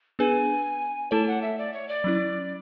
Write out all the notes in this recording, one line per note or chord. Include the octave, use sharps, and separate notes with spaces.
B3 D4 G#4 B4 G#5
A3 E4 A4 C#5 A5
F#5
E5
D5
C#5
D5
F#3 C#4 E4